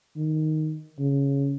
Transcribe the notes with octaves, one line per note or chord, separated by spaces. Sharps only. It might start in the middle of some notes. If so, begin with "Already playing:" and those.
D#3
C#3